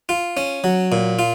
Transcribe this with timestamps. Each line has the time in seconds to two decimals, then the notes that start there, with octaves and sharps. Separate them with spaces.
0.09 F4
0.37 C#4
0.64 F#3
0.92 A#2
1.19 F4